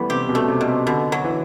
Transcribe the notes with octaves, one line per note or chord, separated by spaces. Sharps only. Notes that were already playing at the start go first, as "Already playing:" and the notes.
Already playing: E3 G3 A3 B3
C3 G4
B2
A3
C3
B2
C3
B2 D3
F#3
E3